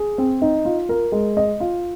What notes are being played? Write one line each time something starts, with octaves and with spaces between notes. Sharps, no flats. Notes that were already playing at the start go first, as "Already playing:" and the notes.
Already playing: G#4
C4
D#4
F4
A#4
G#3
D#5
F4